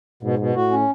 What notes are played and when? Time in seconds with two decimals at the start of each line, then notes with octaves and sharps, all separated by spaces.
0.23 G#2 B2
0.39 B2
0.55 A2 F#4
0.71 C#4